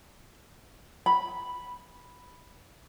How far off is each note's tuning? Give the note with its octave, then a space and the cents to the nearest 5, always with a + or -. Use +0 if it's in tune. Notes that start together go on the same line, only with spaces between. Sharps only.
B5 -5